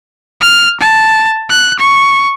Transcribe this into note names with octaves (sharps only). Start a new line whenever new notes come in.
F6
A5
F#6
C#6